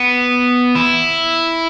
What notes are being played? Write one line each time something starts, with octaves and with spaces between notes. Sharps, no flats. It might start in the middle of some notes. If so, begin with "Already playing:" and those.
Already playing: B3
E4